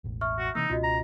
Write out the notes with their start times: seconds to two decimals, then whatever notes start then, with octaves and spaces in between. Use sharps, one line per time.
0.04 E1 A1
0.21 E5 C#6 F6
0.39 F#4
0.55 C3 E3 A#3 D#4 E6
0.70 C#2 B2 C#4 F4 F#4 D#5
0.84 A#5